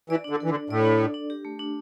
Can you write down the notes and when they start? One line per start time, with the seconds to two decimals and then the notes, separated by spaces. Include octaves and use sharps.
0.10 E3 D5
0.24 D4
0.30 D3
0.40 E3 A4
0.50 D3
0.54 D4
0.70 A2 D5
0.85 D4
1.00 A4
1.14 D4
1.30 G4
1.45 A3
1.59 D4